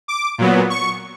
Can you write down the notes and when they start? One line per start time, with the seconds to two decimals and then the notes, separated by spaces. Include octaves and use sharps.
0.08 D6
0.38 A#2 F#3 B3
0.70 C#6